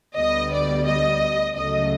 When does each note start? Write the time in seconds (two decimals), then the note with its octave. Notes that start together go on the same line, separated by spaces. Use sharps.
0.17 D2 D3 G3 B3 D#5
0.52 D5
0.86 D#5
1.56 C#2 C#3 F#3 A3 D#5